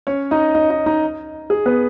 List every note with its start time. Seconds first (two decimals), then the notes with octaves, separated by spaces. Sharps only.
0.07 C#4 C#5
0.31 D#4 D#5
0.55 D#4 D#5
0.70 D#4 D#5
0.86 D#4 D#5
1.50 G#4
1.66 B3 B4